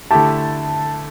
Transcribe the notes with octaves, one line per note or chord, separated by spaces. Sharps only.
D3 A3 E4 G4 A5